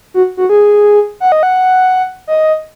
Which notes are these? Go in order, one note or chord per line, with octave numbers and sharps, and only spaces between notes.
F#4
F#4
G#4
F#5
D#5
F#5
D#5